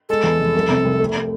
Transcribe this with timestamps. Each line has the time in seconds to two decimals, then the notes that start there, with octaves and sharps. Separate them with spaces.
0.09 G#3 A4
0.24 E2
0.40 F1
0.55 C2
0.69 C3
0.84 C2
1.00 A3